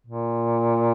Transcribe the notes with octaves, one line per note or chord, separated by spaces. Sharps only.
A#2